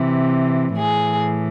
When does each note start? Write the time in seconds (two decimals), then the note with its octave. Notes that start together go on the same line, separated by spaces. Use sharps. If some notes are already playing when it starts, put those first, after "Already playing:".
Already playing: C3 E3
0.77 A2 E3 G#4